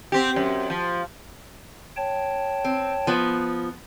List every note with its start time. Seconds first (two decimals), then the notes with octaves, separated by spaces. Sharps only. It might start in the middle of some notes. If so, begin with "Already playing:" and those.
0.12 C4 G4
0.36 F#2
0.70 F3
1.97 C#5 G5 A5
2.65 C4
3.07 F3 B3